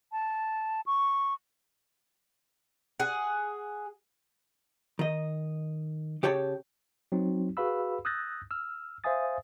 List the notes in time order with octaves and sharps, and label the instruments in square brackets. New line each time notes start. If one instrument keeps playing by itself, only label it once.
[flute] A5
C#6
[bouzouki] G#4 F#5
[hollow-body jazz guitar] D#3 D#5
C#3 G4 C#5 G5 A5
[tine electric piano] F#3 C4 D#4 F#4
F#4 G#4 B4 F5 B5 E6
D#6 E6 F#6 G6 A6 A#6
E6 F6
C5 E5 F5 G#5 D#6 A6